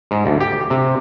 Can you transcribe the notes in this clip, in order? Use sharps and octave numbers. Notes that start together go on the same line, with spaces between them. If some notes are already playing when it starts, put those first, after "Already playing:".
G#2
D2
G4
C3